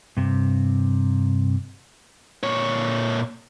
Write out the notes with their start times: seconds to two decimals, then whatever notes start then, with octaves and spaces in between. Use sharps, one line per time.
0.17 G2 C3
2.43 A#2 C#5